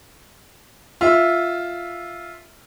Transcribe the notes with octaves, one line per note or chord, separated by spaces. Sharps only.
F4 E5